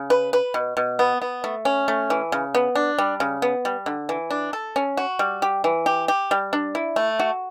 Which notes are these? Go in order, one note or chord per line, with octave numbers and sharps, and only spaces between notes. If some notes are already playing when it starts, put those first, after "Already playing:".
Already playing: C#3
B4
B4
B2
B2
B3
B3
A3
C#4
A3
E3
C#3
B3
D4
G3
C#3
B3
G3
D3
E3
D4
A4
C#4
F#4
G3
G4
E3
G4
G4
G3
D4
E4
A3
F#4